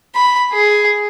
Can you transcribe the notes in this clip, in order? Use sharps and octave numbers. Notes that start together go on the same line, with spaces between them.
B5
G#4